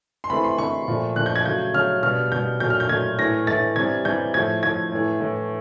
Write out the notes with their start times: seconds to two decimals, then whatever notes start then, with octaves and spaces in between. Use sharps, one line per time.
0.24 C6
0.30 C3 E3 A3 B5
0.44 C6
0.58 C3 E3 A3 C#6
0.88 A#2 F3 A3
1.16 A#2 F#6
1.19 F3 A3
1.26 G6
1.36 G#6
1.45 C#3 F#3 A3 G6
1.74 C#3 F#3 A3 F6
2.03 B2 G3 F6
2.32 B2 G3 G6
2.60 A#2 F#3 A3 G6
2.70 F6
2.80 G6
2.89 A#2 F#3 A3 G#6
3.18 A2 E3 A3 A#6
3.47 A2 E3 A3 A6
3.76 C3 E3 G3 G#6
4.05 C3 E3 G3 G6
4.34 A2 F3 A3 G#6
4.63 A2 F3 A3 G#6
4.92 A2 E3 A3
5.21 A2 E3 A3